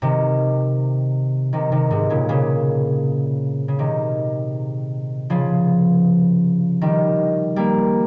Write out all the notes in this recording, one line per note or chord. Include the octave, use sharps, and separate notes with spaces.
C3 D#3
C3 D#3
C3 D#3
G#2 C3
A#2 C#3
A#2 C#3
C#3
C3 D#3
C#3 F3
D#3 G3
G3 A#3